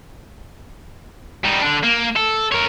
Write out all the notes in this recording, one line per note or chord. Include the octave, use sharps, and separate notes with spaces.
G3 D#4
D3 D4
A#3
A4
A#4 C#5